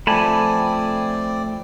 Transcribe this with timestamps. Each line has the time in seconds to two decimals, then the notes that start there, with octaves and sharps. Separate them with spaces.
0.07 F3 A3 C4 D5 G#5 A5 B5